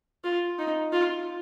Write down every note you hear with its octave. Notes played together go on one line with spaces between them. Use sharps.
F4
D#4
F4